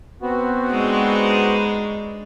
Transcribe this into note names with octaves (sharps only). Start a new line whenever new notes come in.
B3 C4 F#4
G#3 D4 D#4